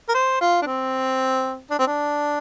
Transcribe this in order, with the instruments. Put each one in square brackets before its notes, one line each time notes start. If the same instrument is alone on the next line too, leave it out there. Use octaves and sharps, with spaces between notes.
[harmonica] A#4
C5
F4
D4
C4
D4
C4
D4